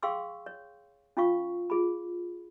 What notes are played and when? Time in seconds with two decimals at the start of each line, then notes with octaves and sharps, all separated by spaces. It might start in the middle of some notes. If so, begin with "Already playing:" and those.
0.03 G#4 F5 G5 C6 C#6 E6
0.46 C#5
1.17 C#4 F4 F5 C#6
1.70 F4 G#4 B5